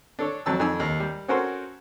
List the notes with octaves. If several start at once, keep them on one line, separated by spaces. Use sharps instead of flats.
D4 A4 C#5
F2 F#3 A5 E6
F2 D#3 G#5 E6
D#2
G3
C4 C#4 F#4 A4 A#4 C5